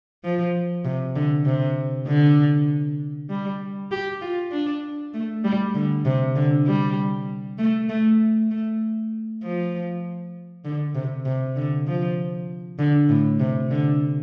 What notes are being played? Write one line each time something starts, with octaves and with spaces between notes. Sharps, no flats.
F3
C3
D3
C3
D3
G3
G4
F4
D4
A3
G3
D3
C3
D3
G3
A3
A3
A3
F3
D3
C3
C3
D3
F3
D3
A2
C3
D3